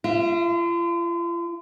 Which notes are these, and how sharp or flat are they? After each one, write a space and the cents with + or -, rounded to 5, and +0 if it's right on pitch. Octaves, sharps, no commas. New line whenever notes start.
F4 -40 E5 +0